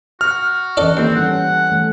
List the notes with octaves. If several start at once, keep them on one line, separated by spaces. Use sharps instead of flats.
F#4 F6
E3 C#4 E4 A4 D5 D#5
D#2 C4 A4
G3 C#4 A4 F#5
E3 A3 A4